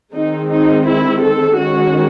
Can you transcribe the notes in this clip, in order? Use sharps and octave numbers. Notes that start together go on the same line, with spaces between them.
D#3 G#3 C4 D#4
D#4
E4
A4
D#3 G#3 C#4 F#4